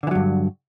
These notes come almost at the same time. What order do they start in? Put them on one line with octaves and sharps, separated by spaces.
D3 E3 F#3 G2